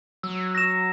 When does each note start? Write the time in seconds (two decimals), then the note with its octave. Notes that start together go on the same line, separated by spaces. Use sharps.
0.23 F#3 E6
0.55 A#6 E7